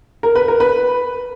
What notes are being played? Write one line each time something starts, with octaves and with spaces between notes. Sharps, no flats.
A#4
B4
A#4
B4